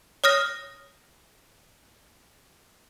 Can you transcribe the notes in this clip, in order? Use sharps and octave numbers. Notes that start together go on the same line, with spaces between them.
C#5 D#6 F6 A#6